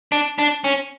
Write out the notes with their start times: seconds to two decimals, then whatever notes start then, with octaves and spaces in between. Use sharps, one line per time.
0.12 D4
0.39 D4
0.64 C#4